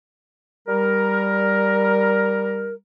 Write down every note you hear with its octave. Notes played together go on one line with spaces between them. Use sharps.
G3 A#4